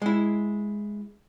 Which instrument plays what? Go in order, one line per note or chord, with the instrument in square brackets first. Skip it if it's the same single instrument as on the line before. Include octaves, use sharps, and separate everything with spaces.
[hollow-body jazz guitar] G#3 E4